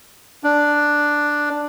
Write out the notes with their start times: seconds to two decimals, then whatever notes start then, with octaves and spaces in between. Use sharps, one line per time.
0.44 D4